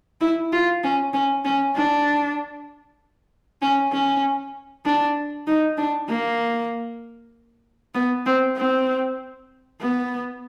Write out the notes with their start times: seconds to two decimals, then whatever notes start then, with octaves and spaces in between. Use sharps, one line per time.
0.21 E4
0.52 F4
0.84 C#4
1.13 C#4
1.45 C#4
1.75 D4
3.62 C#4
3.92 C#4
4.85 D4
5.47 D#4
5.78 D4
6.09 A#3
7.94 B3
8.26 C4
8.57 C4
9.81 B3